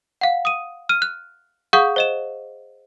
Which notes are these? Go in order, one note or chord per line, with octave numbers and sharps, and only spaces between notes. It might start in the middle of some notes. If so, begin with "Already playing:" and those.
F5 F#5
D#6 D#7
F6 D#7
F#6
G#4 F5 F#5 C#6 D#6 G6
C5 D#5 E7